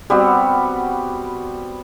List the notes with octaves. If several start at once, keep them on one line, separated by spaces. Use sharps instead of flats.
G3 B3 C4 F#4